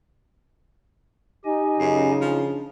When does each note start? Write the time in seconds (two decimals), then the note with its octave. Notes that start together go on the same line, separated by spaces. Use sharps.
1.45 D#4 G4 D#5 G#5
1.79 F#2 C#3
2.21 F3 D4